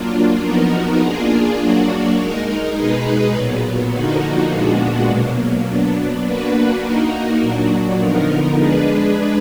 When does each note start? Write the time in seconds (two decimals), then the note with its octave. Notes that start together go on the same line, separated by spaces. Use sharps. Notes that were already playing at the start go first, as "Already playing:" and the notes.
Already playing: F#3 A#3 D4 F4
0.42 F3 B3 D#4 F#4 A#4
1.00 A#3 D4 F4 G#4
1.59 F#3 A#3 D4 F#4
2.17 G#3 D#4 A#4
2.75 B2 G#3 D#4 G#4 B4
3.33 A#2 F#3 B3
3.92 D3 F3 A#3 D#4 F#4
4.50 A#2 G#3 B3 D4 F#4
5.08 B2 F#3 A#3
5.66 F#3 B3 D4
6.24 A#3 D4 F#4 B4
6.83 A#3 D#4 F#4 A#4
7.41 A#2 F#3 D4 F#4
7.99 D3 F3 B3 D#4 A#4
8.57 G#3 D4 G#4 B4